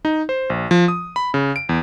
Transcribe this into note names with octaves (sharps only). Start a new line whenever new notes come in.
D#4
C5
A#1
F3
D#6
B5
C#3
D7
E2